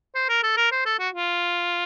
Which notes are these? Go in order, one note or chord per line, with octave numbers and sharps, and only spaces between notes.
C5
A#4
A4
A#4
C5
A4
F#4
F4